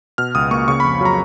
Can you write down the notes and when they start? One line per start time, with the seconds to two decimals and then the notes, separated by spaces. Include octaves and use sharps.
0.18 B2 F6
0.35 C#2 D#6
0.51 A#3 C#6
0.68 C#3 C#6
0.80 F2 B5
1.01 F#3 A#5